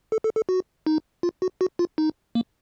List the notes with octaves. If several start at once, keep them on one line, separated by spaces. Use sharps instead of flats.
A4
A4
A4
F#4
D#4
F4
F#4
F#4
F4
D#4
A#3